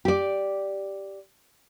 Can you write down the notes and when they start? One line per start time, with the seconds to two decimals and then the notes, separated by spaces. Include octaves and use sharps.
0.05 G4 D5